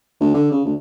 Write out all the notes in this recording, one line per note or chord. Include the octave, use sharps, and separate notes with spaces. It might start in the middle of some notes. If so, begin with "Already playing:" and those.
D2
D3
C#3
D2